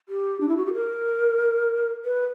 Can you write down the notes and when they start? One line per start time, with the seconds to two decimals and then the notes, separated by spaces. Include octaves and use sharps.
0.09 G4
0.41 D4
0.48 E4
0.57 F#4
0.66 G4
0.74 A#4
2.05 B4